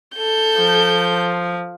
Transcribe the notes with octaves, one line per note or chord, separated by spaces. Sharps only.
A4 G6
F3